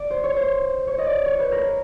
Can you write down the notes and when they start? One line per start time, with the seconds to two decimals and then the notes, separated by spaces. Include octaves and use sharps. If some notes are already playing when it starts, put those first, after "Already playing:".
Already playing: D5
0.10 C5
0.24 C#5
0.36 C5
0.87 C#5
0.98 D#5
1.07 D5
1.26 C#5
1.39 B4
1.52 A#4